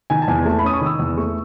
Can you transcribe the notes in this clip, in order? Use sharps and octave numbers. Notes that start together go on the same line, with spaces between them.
D#3 G#5
A5
E2 G#5
A3 A5
B5
C#4 D#6
C#6
D#3 D#6 E6
E2
A3 C#6